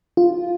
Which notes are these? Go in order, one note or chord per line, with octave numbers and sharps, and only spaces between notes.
F4